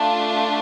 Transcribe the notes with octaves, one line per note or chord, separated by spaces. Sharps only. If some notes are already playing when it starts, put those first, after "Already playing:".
Already playing: A3 D4 F4